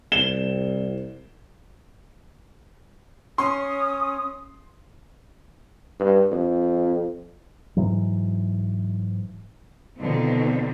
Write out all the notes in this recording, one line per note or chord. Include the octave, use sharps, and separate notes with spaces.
C2 E7 G7
C#4 C6 D#6
G2
F2
G#2 E3 F#3
B2 D3 D#3 F3 C4